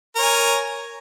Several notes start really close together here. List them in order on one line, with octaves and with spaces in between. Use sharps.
A#4 C#5 G#5